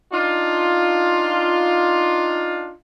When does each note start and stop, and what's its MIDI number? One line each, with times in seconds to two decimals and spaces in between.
0.13 2.73 62
0.13 2.73 63
0.13 2.73 65